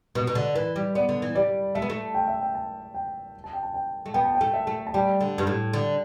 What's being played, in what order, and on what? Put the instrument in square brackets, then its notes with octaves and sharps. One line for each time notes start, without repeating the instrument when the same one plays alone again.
[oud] B2 [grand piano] B4
[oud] B2
D3
[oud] E3 [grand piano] B4
[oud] G3
[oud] B3 [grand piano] D5
[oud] D3
E3
[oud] G3 [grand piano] D5
[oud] A3 [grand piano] E5
[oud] B3
A3
[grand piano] G5
E5
G5
A5
G5
A5
G5
A5
G5
[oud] A3
[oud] B3 [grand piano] G5
[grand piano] A5
G5
[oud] A3
[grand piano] E5
[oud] A3
[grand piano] A5
[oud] G3 [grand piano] G5
[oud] D3
G2
A2
D3